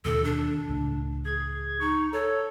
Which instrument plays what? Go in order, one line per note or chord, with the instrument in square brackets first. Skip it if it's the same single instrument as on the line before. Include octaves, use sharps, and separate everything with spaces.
[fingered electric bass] D#2 B2 D#3 [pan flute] A4
[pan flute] D4
[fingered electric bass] C#2 A2
[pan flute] G#4 [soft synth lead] G#6
[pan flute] D#4 [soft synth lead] C#6
[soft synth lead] A4 [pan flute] C#5